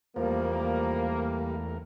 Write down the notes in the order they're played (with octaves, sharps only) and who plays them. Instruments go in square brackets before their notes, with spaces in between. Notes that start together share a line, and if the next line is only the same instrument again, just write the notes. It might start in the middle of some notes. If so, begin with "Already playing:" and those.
[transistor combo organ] E2 A3 A#4 [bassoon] F3 [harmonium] G3 [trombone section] A#3